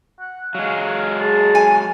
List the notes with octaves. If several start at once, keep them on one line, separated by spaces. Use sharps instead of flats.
F#5
F#3 G#3 F5
G#4 A5
G#5